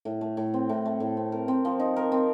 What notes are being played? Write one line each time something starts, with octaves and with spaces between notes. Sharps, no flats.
A2
A3
A2
C4
A2
A3
A2
C4
A#4
C4
F3
D#4
A#4
C4